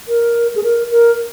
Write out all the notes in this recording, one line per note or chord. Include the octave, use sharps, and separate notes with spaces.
A#4
G#4
A#4
A#4